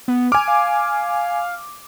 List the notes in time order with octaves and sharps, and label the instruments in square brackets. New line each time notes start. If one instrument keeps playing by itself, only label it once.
[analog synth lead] B3
[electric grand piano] G#5 D6 [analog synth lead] F6
[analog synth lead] F5